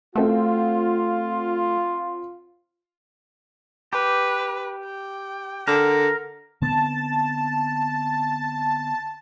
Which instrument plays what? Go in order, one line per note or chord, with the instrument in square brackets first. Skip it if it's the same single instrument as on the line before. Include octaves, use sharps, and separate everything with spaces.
[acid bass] A3 [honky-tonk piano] C4 F#4 [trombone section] F4
[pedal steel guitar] G4 [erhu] B4
[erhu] G5
[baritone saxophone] D3 [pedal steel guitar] A#4
[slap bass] D3 B3 C4 [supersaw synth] A5